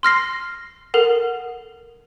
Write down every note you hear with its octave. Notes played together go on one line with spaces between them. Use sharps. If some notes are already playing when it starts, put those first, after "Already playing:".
C6 F6 A#6 C7
A4 A#4 F#5